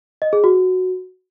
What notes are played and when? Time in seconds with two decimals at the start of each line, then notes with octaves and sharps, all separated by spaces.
0.22 D#5
0.33 G#4
0.44 F#4